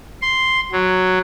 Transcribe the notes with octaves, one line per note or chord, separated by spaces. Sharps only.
C6
F#3